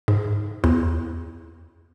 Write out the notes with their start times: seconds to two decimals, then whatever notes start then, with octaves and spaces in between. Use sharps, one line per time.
0.08 G#2
0.64 E2